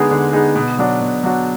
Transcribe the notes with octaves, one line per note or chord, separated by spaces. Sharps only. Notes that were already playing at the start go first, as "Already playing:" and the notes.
Already playing: D3 G#3 B3 D#4 G#4
D3
G#3 B3 D#4 G#4
B2
F#3 D4 F#4
B2
F#3 D4 F#4